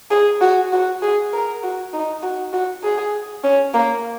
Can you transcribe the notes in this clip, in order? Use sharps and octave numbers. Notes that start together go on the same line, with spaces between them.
G#4
F#4
F#4
G#4
A#4
F#4
D#4
F#4
F#4
G#4
C#4
A#3